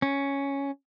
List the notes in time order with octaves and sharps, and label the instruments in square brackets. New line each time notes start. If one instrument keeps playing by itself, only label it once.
[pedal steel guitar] C#4